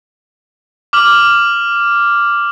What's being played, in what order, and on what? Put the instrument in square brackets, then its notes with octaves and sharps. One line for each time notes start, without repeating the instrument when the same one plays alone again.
[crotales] D6 F6 F#7